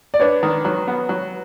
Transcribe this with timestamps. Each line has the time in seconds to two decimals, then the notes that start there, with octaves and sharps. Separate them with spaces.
0.14 D5
0.20 D4 B4 C#5
0.43 D#3
0.65 F#3
0.88 B3
1.09 F#3